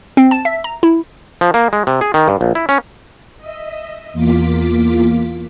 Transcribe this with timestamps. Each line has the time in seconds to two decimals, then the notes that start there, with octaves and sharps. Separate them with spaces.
0.17 C4
0.31 A5
0.45 E5
0.64 A#5
0.83 E4
1.41 F3
1.54 A#3
1.73 G#3
1.87 C3
2.01 G#4
2.14 D#3
2.28 G2
2.41 A#1
2.55 E4
2.69 C#4
3.37 D#5 E5
4.13 E2 A#3 F4 D6 B6